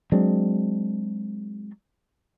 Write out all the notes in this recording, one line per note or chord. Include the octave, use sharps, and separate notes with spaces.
F#3 G#3 C4 D4